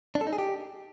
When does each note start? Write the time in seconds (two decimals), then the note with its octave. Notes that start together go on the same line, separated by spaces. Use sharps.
0.15 D4
0.21 A4
0.27 D#4
0.33 G#4
0.38 G4